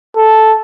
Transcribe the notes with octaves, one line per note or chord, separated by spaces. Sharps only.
A4